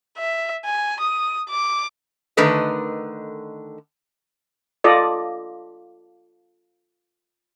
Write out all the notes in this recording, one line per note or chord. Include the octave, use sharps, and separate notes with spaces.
E5
G#5
D#6
D6
D3 D#3 A3 A#4 B4 D#5
F4 A4 D5 D#5